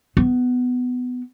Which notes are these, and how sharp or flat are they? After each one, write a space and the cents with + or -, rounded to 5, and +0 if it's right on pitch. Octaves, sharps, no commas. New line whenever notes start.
B3 +15